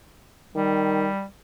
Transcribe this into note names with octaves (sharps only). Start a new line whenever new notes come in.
D#3 G3